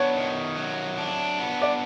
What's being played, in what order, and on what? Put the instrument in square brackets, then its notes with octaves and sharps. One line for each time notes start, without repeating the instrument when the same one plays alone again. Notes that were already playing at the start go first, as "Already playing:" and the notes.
Already playing: [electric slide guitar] B3 D4 [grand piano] C#5
[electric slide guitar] D#3
F#3
D4
B3
[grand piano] D5